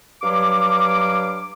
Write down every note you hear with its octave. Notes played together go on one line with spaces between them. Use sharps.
G2 F#3 F5 D6